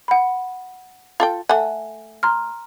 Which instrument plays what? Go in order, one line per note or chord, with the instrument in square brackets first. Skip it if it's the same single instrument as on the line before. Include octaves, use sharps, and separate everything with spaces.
[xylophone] F#5 B5
[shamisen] F4 A4 G5
[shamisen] A3 F#5 [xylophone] G#5
[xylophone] A#5 C6 F6